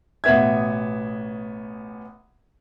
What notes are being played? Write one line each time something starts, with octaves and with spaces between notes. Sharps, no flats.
A1 B2 B3 E5 G#6